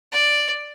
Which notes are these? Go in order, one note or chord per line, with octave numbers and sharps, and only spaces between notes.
D5